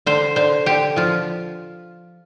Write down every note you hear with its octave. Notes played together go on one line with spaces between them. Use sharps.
D3 C5
D3 C5
D3 G4
F3 F4